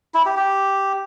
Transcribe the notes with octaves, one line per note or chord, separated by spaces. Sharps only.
E4
G4
G4